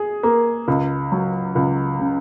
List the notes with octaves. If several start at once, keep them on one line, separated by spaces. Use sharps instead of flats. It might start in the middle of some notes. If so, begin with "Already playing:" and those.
Already playing: G#4
A#3
C#2
F#3
C#2
C#3